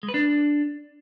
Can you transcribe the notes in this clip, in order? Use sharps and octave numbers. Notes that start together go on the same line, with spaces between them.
G#3
B4
D4